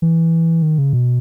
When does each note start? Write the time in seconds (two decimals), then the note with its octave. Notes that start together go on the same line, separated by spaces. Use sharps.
0.02 E3
0.62 D#3
0.78 C#3
0.93 B2